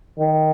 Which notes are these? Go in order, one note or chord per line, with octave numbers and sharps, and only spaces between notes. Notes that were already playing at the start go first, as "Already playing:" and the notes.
D#3